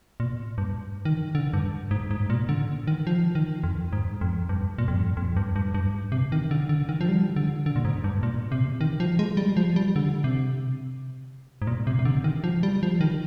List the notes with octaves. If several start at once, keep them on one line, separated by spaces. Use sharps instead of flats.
A#2
G2
D#3
D3
G2
G#2
G#2
A#2
D3
D#3
F3
D#3
F2
G#2
F2
G2
A#2
F2
G2
F2
G2
G2
G2
C3
D#3
D3
D3
D#3
F3
G3
D3
D3
A#2
G#2
G2
A#2
C3
D#3
F3
G#3
G3
F3
G3
D3
C3
G#2
A#2
C3
C3
D3
D#3
F3
G3
F3
D#3